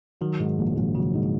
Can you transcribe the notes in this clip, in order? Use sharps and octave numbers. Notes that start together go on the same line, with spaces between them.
D#3 F#3
G#2
A#1
A#1
C#3 F#3
G#2